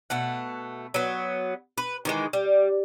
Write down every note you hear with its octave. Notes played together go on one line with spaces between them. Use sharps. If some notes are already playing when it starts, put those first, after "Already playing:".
B2 A3 F#5
F#3 B3
B4
D#3 E3 G#3
G3